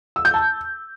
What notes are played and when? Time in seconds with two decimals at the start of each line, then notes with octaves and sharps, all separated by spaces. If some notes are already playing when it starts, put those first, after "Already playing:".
0.16 E6
0.25 G6
0.34 A5